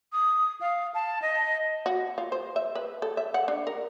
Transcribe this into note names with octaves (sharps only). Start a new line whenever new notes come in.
D#6
F5
A5
D#5
F#4
F4
C5
E5
B4
A4
E5
F#5
D4
A#4